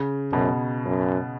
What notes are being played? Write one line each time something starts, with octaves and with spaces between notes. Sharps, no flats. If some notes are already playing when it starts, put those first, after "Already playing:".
Already playing: C#3
F#2 B2
F#2